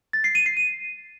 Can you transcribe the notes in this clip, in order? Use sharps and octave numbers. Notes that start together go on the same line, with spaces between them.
A6
C7
D#7
C7
D#7